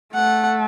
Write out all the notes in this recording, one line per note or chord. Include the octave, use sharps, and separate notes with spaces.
A3 F#5